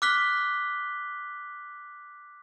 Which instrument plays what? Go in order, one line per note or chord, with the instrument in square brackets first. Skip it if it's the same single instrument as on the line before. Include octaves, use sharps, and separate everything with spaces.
[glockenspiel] D6 F6 F#6 B6 G7